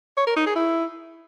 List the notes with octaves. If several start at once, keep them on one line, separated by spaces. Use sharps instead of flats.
C#5
A#4
D#4
G#4
E4